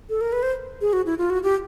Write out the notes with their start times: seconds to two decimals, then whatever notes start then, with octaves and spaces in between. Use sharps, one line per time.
0.09 A4
0.21 A#4
0.32 B4
0.43 C5
0.81 G#4
0.93 F#4
1.06 E4
1.18 F4
1.30 F#4
1.43 G4